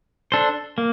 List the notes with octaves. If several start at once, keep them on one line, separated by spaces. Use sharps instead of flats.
D4 A4 C5
A#3